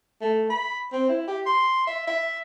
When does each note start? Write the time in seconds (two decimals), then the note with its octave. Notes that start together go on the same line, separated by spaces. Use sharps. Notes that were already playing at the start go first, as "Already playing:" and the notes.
0.21 A3
0.50 B5
0.93 C4
1.09 E4
1.28 G4
1.46 C6
1.87 E5
2.07 E5